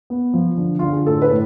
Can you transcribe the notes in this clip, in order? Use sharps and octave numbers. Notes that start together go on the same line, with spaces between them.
B3
F3
D3
D3 F4
G#4
A2 A4
B4
A2